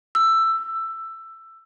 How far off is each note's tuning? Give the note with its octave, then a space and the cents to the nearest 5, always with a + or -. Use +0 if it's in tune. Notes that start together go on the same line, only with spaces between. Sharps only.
E6 +10